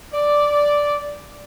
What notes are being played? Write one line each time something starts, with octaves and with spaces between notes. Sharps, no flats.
D5